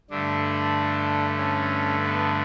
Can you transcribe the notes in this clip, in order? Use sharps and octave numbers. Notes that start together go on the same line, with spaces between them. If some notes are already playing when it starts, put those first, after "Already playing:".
G2 D3 A3 D4
C#4
B3